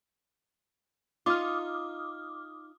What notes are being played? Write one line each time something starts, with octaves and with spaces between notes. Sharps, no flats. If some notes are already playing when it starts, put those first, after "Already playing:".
D#4 F4 D6 D#6 F6